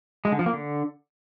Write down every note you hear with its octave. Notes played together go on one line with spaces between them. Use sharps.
G#3
D3
F3
A#3
D3